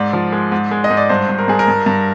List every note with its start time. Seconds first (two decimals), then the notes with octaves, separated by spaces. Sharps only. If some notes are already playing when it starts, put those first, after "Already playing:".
Already playing: G#2 D5
0.13 F3
0.32 G#3
0.52 G#2
0.71 G#3
0.84 D#5
0.90 G#2
0.97 D5
1.09 G2 C5
1.29 G2
1.39 A#4
1.48 G2 G#4
1.59 A#4
1.68 G2
1.86 G2